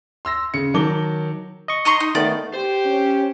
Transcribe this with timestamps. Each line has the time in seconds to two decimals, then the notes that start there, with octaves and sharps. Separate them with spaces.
0.25 C6 E6 A#6
0.54 C#3 C#7
0.74 D#3 F#3 A5 D6 G7
1.68 D#5 C#6
1.85 D#4 D#5 A#5 C6 C#6
2.00 D#4
2.15 D#3 A3 B3 D5
2.54 G4 C5
2.86 C#4